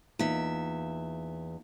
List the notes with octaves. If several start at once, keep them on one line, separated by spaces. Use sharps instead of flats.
E2 A#3 D#4 F4 E5